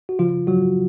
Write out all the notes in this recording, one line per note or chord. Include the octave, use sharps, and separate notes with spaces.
F#4
C#3 F3 F4
F#3 F#4
F#3